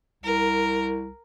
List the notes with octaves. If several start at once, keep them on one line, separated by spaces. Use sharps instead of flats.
C2 A#4